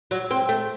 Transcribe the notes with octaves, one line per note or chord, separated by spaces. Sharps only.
F#3
C4
A3